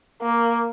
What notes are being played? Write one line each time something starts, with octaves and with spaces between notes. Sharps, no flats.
A#3